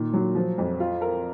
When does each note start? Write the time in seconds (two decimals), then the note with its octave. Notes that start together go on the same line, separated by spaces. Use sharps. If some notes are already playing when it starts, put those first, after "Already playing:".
Already playing: A#2 D#3
0.13 F#3
0.35 F3
0.58 F2
0.80 F4
1.01 A#4